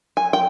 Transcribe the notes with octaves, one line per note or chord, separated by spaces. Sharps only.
G#5
G5